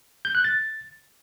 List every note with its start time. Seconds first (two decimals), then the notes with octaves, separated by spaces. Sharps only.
0.25 G6
0.35 F#6
0.44 A6